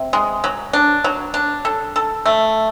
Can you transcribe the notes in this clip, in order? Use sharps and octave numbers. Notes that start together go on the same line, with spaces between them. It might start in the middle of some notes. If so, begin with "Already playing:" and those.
Already playing: C3
G#3
F#3
D4
F#3
D4
A4
A4
A3